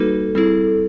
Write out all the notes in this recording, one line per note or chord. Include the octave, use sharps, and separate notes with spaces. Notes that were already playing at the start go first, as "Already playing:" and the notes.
Already playing: G3 A#3 D#4 F#4 A4 B4
G3 C4 E4 G#4 A4